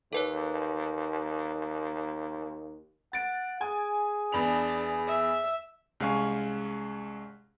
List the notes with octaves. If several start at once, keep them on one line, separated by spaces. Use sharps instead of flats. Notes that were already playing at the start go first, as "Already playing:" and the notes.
D#2 A4 B4 C#5
F#5 A6 D7
G#4 G#5
E2 D4 B5 F7
E5
C2 G#3 C#4 F5 G#5 C#6